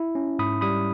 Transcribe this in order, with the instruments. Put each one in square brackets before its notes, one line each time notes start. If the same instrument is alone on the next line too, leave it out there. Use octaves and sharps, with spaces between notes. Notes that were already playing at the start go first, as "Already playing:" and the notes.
Already playing: [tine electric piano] E4
C#4
G#2 B5 D#6
G3 B5 D#6